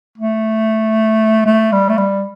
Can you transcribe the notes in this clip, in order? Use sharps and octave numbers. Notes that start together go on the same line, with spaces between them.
A3
A3
G3
A3
G3